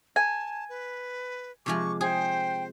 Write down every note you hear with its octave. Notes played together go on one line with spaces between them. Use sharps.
G#5 A5
B4
C3 F3 G#3 C#6 D6
G#4 C5 G5